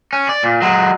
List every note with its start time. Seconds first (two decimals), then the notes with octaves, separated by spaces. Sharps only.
0.13 C#4
0.29 D5
0.43 A#2
0.62 F#3 G#3